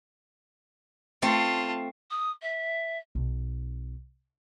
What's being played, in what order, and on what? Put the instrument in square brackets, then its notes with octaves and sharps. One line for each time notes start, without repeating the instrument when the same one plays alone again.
[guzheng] A3 C4 [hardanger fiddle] F4 A5
[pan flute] D#6
E5
[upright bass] B1 D#4